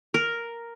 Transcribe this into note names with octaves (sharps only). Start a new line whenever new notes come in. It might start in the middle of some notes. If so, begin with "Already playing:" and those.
A#4